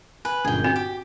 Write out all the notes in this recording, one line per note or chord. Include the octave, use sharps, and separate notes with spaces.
B4 G#5
G1 F#2 A#2 G#4 G5
C4 F#4
G4